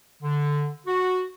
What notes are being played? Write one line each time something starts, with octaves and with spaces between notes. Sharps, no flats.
D3
F#4